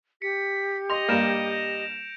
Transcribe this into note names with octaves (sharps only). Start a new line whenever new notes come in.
G4 B6 C#7
D#5 C6 A#6 F7
G2 G3 A#3 G6 D7 E7